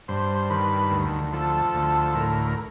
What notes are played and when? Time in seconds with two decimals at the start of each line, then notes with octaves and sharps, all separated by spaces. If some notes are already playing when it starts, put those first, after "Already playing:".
0.08 G2 C5
0.50 D#3 B4
0.91 D2
1.33 F3 A4
1.74 D2
2.15 A2 A#4